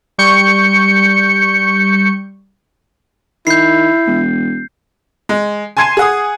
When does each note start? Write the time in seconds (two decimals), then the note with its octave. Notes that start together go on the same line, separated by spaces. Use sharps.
0.18 G3 C#6 G6 C#7
3.47 D#3 E4 G6 C7
4.07 E1
5.29 G#3
5.77 G#5 A5 C6 G#6 C7 D#7
5.97 G#4 F#5 D#6